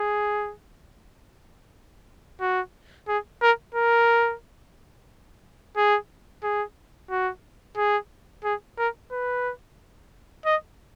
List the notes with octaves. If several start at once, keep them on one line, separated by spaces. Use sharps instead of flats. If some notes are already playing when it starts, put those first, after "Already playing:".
Already playing: G#4
F#4
G#4
A#4
A#4
G#4
G#4
F#4
G#4
G#4
A#4
B4
D#5